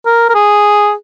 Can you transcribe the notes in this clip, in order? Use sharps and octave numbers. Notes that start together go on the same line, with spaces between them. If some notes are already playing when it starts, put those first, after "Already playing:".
A#4
A#4
G#4